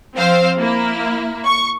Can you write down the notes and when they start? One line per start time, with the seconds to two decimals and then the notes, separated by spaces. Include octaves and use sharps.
0.16 F3 C4 C5 F5
0.58 A#3 E4
1.45 C#6